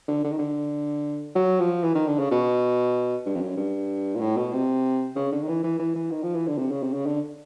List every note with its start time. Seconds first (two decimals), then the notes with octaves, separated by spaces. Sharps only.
0.08 D3
0.24 D3
0.32 D#3
0.39 D3
1.35 F#3
1.60 F3
1.83 E3
1.95 D#3
2.07 D3
2.19 C#3
2.31 B2
3.26 G2
3.35 F2
3.41 F#2
3.57 G2
4.15 A#2
4.20 A2
4.37 B2
4.53 C3
5.16 C#3
5.32 D3
5.42 D#3
5.48 E3
5.64 E3
5.79 E3
5.96 E3
6.11 D#3
6.23 F3
6.35 E3
6.48 D3
6.58 C3
6.71 C#3
6.83 C3
6.94 C#3
7.06 D3